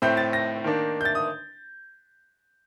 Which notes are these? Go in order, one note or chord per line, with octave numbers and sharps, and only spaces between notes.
A2 A3 C4 G6
A6
A#6
D#3 A#3 D4
G6
A6
D#6